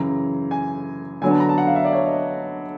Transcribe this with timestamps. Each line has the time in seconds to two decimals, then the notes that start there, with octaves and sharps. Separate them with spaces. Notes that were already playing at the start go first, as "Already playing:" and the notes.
Already playing: F#2 C#3 E3 A#5
0.51 G#5
1.22 D3 F#3 B3 D4 G#5
1.31 A5
1.40 A#5
1.49 A5
1.58 F#5
1.67 F5
1.75 E5
1.85 D5
1.93 C#5
2.06 D#5